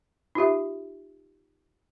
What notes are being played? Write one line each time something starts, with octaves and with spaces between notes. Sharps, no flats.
D#4 F4 G4 E5